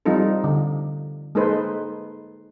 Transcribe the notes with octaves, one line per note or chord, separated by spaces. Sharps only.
F3 G3 C4 D#4 F4 A4
D3
G#3 A#3 D#4 A4 B4 C5